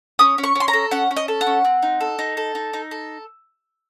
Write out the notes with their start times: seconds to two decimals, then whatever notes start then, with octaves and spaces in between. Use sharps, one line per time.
0.19 C#4 D#6
0.38 C#4
0.44 C#6
0.55 C#4 C6
0.68 A#5
0.73 A4
0.91 C#4 F#5
1.11 C#4
1.17 D#5
1.28 A4
1.41 F#5
1.47 C#4
1.65 C4
1.82 D#4
2.01 A4
2.19 D#4
2.37 A4
2.55 D#4
2.73 D#4
2.91 A4